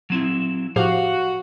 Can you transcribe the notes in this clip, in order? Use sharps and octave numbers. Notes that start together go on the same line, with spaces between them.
F#3 C4 E4
A2 F3 F#4 G4 F5